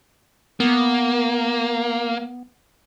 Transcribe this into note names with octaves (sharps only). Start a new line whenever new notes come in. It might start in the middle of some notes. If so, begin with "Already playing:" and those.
A#3 B3